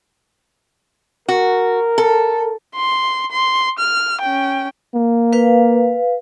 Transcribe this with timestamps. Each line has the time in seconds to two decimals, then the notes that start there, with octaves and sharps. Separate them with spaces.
1.28 F#4 A#4
1.98 A4
2.75 C6
3.31 C6
3.79 F6
4.21 C#4 G5
4.95 A#3
5.33 B4 F5